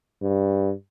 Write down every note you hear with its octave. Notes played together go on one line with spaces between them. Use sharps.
G2